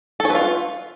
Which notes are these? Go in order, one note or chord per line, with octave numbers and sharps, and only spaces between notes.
A4
C#5
B4
F4